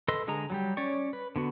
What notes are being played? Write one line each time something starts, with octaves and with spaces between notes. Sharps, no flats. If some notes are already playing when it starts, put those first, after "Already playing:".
A4 B4 D#5 C6
D3 G#3 G#4 A#5
F#3 G3 G4
C#4 C#5 D5 C#6
B4
D3 B3 F#4